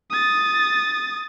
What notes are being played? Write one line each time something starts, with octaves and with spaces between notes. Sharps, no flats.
D#6 A6